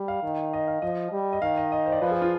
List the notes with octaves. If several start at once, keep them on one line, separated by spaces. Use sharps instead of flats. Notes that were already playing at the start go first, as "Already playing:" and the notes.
Already playing: G3
F5
D#3
D#5
F5
F3 D#5
G3
D#5
D#3 F5
D#5
D#5
C5
D5
F3 B4
G#4
F4